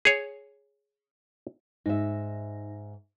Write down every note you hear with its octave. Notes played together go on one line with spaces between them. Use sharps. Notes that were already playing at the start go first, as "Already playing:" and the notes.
G#4 C#5
G#2 D#4 E5